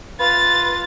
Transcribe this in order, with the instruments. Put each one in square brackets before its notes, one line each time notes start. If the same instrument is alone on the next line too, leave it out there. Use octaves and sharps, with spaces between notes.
[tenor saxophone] F4 [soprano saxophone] B4 [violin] A6